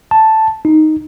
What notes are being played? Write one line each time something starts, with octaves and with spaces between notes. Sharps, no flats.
A5
D#4